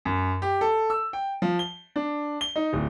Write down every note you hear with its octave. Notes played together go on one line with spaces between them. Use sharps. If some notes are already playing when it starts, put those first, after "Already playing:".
F#2
G4
A4
E6
G5
F3
G7
D4
G7
D#4
D1